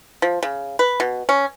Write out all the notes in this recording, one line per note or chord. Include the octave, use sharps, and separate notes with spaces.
F3
C#3
B4
B2
C#4